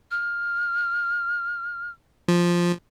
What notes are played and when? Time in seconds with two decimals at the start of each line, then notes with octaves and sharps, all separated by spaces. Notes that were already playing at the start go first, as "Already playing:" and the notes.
0.11 F6
2.28 F3